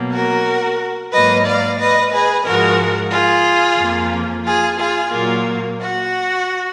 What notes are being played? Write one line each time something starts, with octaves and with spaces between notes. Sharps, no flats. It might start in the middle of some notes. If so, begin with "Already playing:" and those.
Already playing: B2 F#3 A#3
F#4 A#4
G#2 F#3 A#3 B4 D#5
D5 F5
B4 D#5
G#4 B4
G#2 F3 G#3 F#4 A#4
F4 G#4
F2 F3 A#3
F4 G#4
F4 G#4
A#2 F#3 A#3 F4
F#4